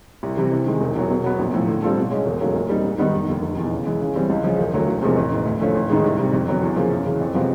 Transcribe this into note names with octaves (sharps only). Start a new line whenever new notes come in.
C2
C3 E3 G3
C3
D#3 G#3
E1
E2 B2 F#3
B2
F#3 B3
A#1
A2 F3
D3
G3 C4 F4 A4
B2
G#3 C#4
E1
D#2 C#3 F#3 A3
A#2
G3 C4 D#4
G#2
D#3 G3 B3 D#4
F1
D#2 D3
F1
E2 B2
C#3
E3 G#3
C#3
E3 G3 C4
C#2
C#3 F3
E1
D2 D3 F#3
E1
E2 C3 F3 G#3
A1
G#2 E3
D2
D3 F3 A3 C#4
A1
G#2 D#3 G#3
C2
C3 D#3 G3
F2
D3 F#3 B3
E2
C#3 F3 A#3
F#2
C#3 E3
F2
C3 F3 G#3 B3